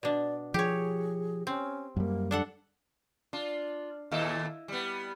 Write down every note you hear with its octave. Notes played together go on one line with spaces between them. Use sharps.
B2 D4 D5
F3 G4 G#4 C#5
C4 C#4
F#2 G3 A#3
D4 A4 F#5
D4 F4
D#2 A#2 E4 A4 D#5 F5
G3 B3